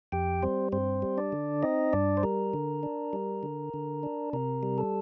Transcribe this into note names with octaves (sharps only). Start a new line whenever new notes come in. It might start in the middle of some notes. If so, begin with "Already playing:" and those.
F2 G4 G5
G3 C4 C5
G2 C4 C5
G3
D4 D5
D3
C4 D#4 D#5
G2 D4 D5
C5
G3 A#4
D3
D4
G3
D3
D3
D4
C3 A#4
G3
A4